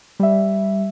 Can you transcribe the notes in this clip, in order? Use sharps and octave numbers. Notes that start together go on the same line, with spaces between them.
G3 E5